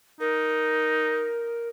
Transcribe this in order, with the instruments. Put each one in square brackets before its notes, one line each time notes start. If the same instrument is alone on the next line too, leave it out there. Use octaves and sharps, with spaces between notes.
[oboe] D#4 [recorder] A#4